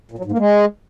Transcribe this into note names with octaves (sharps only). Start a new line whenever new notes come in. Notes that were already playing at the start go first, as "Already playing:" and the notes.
A#2
F#3
G#2
A#3
G#3